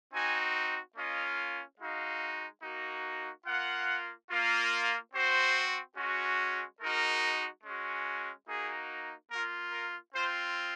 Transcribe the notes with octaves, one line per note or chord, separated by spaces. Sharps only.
C4 D#4 F#4 G#5
A#3 C#4 F4 D#5
G#3 D#4 F#4 F5
A#3 D#4 F#4
A#3 F4 F#5
A#3 F4
C4 F#4 C5
G#3 C#4 F#4
G#3 D#4 F#4 A#4
G#3 C#4 F#4
A#3 D#4 F#4 G#4
A#3 F4 A#4
A#4
C4 F4 C5